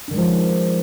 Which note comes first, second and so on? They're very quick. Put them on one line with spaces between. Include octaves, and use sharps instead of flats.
D4 D#3 G#3 F3